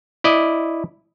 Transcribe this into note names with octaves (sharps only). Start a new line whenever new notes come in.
E4 D5 D#5